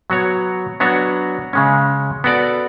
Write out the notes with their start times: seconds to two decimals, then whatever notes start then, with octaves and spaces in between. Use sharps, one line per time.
0.10 F#3 B3 F#4 C#5
0.80 F#3 B3 D4 F#4 C#5
1.53 C#3 G#3 C#4
2.24 B3 F#4 A4 D5